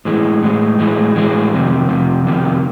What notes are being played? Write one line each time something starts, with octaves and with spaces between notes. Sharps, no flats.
A2 E3 G#3
A2 E3 G#3
A2 E3 G#3
A2 E3 G#3
F2 C3 D#3
F2 C3
F2 C3 D#3